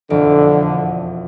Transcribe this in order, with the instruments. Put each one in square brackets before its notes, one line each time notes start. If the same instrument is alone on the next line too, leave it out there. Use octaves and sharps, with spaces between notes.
[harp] E1 F2 D7 [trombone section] D3